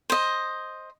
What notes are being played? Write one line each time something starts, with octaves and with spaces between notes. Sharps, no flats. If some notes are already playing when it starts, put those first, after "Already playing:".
C5 D#5